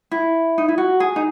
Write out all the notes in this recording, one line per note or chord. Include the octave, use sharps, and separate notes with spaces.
E4
D#4
E4
F#4
G#4
D#4